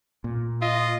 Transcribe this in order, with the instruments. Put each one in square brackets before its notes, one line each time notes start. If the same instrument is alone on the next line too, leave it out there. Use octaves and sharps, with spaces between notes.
[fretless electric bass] A#2
[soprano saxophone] F4 [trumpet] D#5